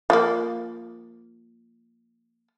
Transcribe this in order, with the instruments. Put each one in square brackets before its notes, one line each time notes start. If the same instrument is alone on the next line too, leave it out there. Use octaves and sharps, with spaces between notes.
[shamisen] F3 A3 A#3